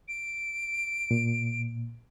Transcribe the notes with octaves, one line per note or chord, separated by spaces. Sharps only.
D7
A#2